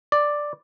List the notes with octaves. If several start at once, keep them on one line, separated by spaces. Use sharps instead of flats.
D5